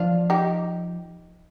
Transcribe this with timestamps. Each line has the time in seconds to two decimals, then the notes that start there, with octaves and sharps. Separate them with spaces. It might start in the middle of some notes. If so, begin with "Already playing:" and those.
Already playing: F3 D4 F4
0.30 D#4 G4